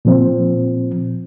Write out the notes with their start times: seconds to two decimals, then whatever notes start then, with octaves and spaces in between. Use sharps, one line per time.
0.05 A#2 F3 C4